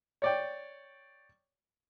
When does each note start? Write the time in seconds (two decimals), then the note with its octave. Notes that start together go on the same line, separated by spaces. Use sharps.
0.22 C#5 D5 G5